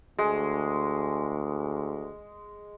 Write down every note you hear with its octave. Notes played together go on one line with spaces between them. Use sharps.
D2 G#3